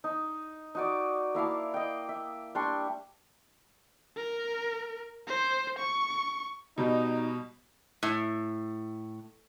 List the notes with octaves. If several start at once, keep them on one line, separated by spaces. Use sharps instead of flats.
D#4
D#4 F#4 D5
A#3 E4 F5 A5
D#5 G5
E5
G3 D4 C6 C#6
A#4
C5
C#6
B2 G3 D#4
A2